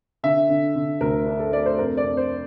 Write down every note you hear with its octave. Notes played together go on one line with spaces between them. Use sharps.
D3 E5
D3
D3
D2 A#4
D4
A4
A3 D5
C5
F2 A#4
D5
F2
C5